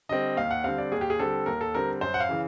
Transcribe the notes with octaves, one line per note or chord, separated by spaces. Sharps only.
D3 G3 C4 D#5
D#2 F5
F#5
D3 G3 C4 F5
D5
D#2 G#4
G4
G#4
D3 G3 C4 A4
D#2 A#4
A4
D3 G3 C4 A#4
F#2 C5
F#5
F5
C#3 E3